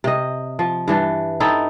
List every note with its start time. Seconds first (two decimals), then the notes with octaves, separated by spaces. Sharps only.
0.04 C3 D#5
0.59 F3
0.88 G2 E3 D4
1.40 C4 D#4 E4 A4